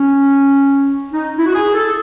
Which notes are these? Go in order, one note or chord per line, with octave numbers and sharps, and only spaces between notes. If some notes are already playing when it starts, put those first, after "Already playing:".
Already playing: C#4
D#4
E4
F#4
G#4
A4